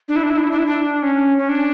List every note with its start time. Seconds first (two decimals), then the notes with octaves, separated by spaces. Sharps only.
0.08 D4
0.15 E4
0.23 D4
0.30 E4
0.37 D4
0.43 E4
0.51 D4
0.58 E4
0.65 D4
1.02 C#4
1.37 C#4
1.49 D4